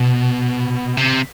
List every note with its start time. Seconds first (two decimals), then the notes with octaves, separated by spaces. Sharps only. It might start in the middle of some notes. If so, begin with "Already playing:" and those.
Already playing: B2
0.97 C3